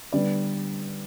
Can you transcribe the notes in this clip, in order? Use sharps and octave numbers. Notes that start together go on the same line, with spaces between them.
D3 G3 B3 D5